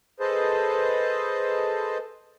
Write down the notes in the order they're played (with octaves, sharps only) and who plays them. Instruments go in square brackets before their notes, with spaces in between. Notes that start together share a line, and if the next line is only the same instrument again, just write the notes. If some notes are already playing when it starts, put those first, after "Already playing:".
[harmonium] G#4 A4 B4 C5 D#5 A5